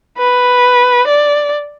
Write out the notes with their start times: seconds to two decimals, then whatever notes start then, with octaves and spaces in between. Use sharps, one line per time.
0.18 B4
1.07 D5